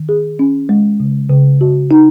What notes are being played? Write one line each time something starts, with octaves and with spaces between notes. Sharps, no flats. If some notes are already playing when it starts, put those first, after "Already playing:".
Already playing: D#3
G#4
C#4
G#3
C#3
C#3
F#4
D#4